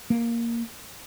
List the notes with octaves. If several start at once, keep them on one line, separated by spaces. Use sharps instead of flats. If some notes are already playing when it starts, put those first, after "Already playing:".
A#3